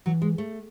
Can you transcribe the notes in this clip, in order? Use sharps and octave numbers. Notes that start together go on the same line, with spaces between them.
E3 F#3
G#3
A3